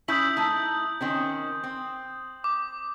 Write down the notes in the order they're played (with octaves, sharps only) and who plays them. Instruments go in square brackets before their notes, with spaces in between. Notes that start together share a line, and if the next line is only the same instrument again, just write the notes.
[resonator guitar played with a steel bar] C#4 E4 [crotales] D#6 G6 F#7
[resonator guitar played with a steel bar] A3 D#4 E4
D#3 C4 C#4
C4
[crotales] D6